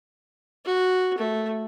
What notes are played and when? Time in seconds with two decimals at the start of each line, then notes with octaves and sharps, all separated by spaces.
0.66 F#4
1.18 A3